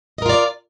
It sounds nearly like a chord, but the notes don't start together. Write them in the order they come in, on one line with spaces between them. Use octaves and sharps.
D#5 A#4 F4 D5